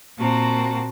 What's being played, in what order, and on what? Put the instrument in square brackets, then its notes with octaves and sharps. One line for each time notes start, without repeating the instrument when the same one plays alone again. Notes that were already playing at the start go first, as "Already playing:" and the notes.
[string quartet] A#2 A#3 C4 F#4 A5 A#5